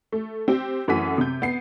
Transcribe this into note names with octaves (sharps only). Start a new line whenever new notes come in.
A3
C4 G4
F#2 E3 A3 F#4 B6 D#7
C3 G6
B3 C7